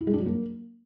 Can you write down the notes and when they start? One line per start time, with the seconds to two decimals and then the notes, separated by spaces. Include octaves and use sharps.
0.01 E4
0.07 G#3
0.13 D4
0.20 F#3
0.26 A#3